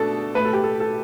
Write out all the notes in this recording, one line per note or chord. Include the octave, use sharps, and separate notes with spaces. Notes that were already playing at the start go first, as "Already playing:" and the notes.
Already playing: B2 A3 D4 A4
A2 A3 B4
A4
G4
A4
A4